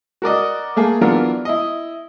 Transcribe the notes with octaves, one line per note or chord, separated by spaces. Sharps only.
F#4 A#4 D5 D#5
A3 A#3 G#4
E3 F#3 B3 D4 F4 A#4
E4 D#5